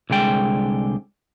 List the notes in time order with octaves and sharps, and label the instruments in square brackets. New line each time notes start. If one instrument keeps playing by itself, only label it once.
[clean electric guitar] C2 D3 G#3 G5